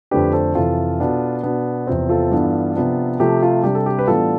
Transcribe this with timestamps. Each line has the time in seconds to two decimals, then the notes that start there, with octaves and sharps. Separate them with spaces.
0.11 F2 D3 A3 D4 G4 B4
0.33 A4 C5
0.55 F2 C3 E3 F4 A4
1.00 B2 B3 D4
1.43 B2 B3 D4
1.87 E2 C3 F3 C4
2.09 F4 A4
2.32 G2 E3 B3 D4
2.76 C3 F3 B3 D4
3.20 C3 F3 A3 G4
3.43 F4
3.63 C3 G3 D4 G4
3.75 A4
3.86 G4
3.99 B4
4.07 A2 E3 G3 B3 D4 F4 A4